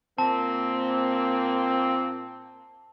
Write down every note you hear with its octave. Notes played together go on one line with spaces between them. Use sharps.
A#2 A#3 C4 A5